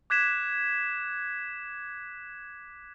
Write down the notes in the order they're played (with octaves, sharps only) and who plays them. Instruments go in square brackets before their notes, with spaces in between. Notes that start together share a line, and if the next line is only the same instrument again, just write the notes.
[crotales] D6 F#6 G#6 B6 E7